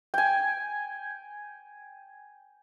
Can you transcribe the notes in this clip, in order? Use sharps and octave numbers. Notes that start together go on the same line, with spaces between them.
G5 G#5